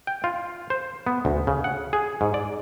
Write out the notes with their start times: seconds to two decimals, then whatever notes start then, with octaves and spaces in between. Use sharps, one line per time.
0.07 G5
0.24 F4
0.70 C5
1.07 B3
1.25 D2
1.47 C#3
1.64 F#5
1.93 G#4
2.21 G#2
2.34 D5